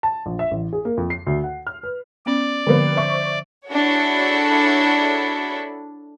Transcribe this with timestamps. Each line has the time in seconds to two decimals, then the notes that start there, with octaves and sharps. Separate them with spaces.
0.03 A5
0.26 A#1
0.39 E5
0.51 A1
0.73 G#4
0.85 A#3
0.97 F2
1.10 C7
1.26 D2
1.44 F#5
1.67 F6
1.83 B4
2.26 B3 C#4 D5
2.67 D3 F3 G3 A#3 B3
2.96 C5 E5 C#6
3.70 D4 E4 F#4 G#4 A4 C#5